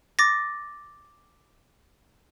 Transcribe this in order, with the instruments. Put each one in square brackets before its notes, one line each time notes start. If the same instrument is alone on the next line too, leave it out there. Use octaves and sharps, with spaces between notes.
[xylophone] D6 A6 A#6